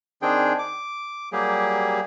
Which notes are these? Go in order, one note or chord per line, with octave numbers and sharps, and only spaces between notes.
D#3 C4 D4 G#4 G5
D6
F#3 G3 A#3 G4 G#4